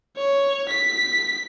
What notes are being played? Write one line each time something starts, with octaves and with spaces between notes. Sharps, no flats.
C#5
B6